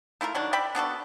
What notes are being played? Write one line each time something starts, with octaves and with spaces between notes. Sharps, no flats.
A3 E4 F4 A#4
D#3 F#3 D4
D5 E5 G5 B5
B3 D4 F#4 A4